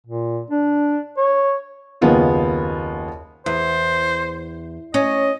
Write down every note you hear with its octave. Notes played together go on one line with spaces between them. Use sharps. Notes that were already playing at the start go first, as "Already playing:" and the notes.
A#2
D4
C#5
F#1 D#2 C#3 B3 F4 G#4
E2 C5
C#4 D#5